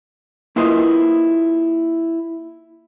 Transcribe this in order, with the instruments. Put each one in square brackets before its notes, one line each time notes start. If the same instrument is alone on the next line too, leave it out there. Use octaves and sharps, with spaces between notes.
[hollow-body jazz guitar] A#3 E4 F4 B4 C5 D#5